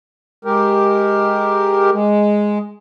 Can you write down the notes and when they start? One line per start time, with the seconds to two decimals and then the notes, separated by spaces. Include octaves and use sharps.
0.45 G#3 G4 A#4
1.92 G#3